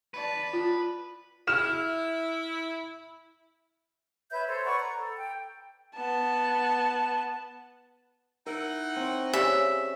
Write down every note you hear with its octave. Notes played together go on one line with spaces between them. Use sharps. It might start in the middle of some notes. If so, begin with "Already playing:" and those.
B4 D5 A5
F4
E4 F6 E7
B4 C#5 E5 G6
A4 C5 C#5
B4 D5 F#5 C#6
A#5
A4
G5
B3 A5
D#4 E4 A#4 F#5
C4 C#6
C#3 G4 D5 E5 G#5